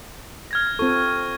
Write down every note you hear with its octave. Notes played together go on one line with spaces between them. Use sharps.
F6 G#6 A#6
C4 F4 A4 C#6